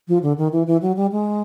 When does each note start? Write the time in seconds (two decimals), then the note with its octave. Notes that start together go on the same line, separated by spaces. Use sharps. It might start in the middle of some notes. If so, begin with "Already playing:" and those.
0.08 F3
0.23 D3
0.38 D#3
0.53 E3
0.67 E3
0.82 F#3
0.96 G3
1.12 G#3